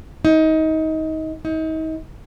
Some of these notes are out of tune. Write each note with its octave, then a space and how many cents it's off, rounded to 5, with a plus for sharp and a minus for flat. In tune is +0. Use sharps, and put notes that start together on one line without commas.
D#4 +25
D#4 +35